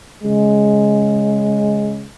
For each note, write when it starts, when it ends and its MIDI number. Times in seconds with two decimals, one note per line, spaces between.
0.24 2.08 49
0.24 2.08 56